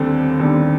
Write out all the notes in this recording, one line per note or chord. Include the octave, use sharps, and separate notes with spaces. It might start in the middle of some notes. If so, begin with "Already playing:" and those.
Already playing: D#2 D3 G3 C4 A4
D#2 D3 G3 C4